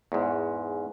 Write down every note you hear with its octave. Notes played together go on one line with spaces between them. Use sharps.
E2 G#2